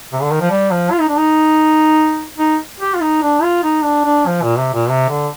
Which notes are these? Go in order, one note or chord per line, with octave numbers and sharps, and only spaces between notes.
C3
D3
D#3
F3
G3
F3
F4
D#4
D4
D#4
D#4
G4
F4
D#4
D4
F4
D#4
D4
D4
F3
A#2
C3
A#2
C3
D3